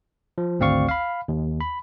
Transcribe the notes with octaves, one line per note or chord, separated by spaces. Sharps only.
F3
G#1 D2 C4 D5 F5 C#6
F5 B5
D#2
B5